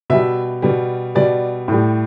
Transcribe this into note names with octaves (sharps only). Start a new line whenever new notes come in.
B2 G3 E5
B2 G3
B2 G3 D5
A2 G3